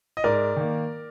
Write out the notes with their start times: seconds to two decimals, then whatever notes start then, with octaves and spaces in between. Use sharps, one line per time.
0.17 D#5
0.24 G#2 A#4 D5
0.57 D#3 A#3